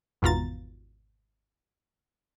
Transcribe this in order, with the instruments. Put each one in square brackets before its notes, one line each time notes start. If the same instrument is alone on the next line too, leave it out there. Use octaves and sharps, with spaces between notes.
[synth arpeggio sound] G#1 E2 B2 F4 A#5 A6